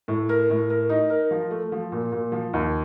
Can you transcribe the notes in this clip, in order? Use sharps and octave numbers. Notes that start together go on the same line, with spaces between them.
A2
A#4
A2
A#4
D#4
A#4
F3
A3
F3
A#2
A#2
F3
D#2